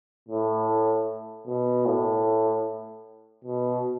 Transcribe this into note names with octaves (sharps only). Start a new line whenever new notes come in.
A2
B2
A2
B2